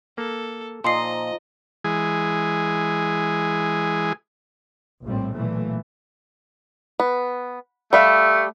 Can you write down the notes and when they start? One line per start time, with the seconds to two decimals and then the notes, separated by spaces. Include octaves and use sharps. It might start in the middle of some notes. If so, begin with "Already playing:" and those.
0.18 A#3 A4
0.84 A#2 F3 D#4 D#5 A5 C6 C7
1.84 E3 G#3 G#4
5.04 A#1 A2 G3 C4
5.33 B1 A#2 E3 A3
7.00 B3
7.93 G3 A3 E5 F5